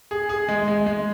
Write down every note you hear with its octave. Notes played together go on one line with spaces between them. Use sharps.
G#4
G#4
G#3
G#3
G#3